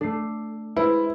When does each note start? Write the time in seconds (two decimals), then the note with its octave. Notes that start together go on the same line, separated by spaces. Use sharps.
0.01 A3 D4 A4 C7
0.77 G#3 E4 B4 C5 D7